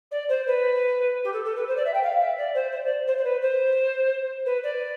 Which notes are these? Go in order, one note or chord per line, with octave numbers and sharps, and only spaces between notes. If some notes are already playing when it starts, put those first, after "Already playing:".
D5
C5
B4
G4
A4
A4
B4
C5
D5
E5
G5
F5
E5
D5
C5
C5
D5
C5
C5
B4
C5
B4
D5